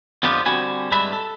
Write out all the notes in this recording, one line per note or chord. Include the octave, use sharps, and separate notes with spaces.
F2 D3 B3 C4 F4 G4
D3 G3 C4 F#4 G#5 B5
G2 G#3 D4 B4 E5 B5
A4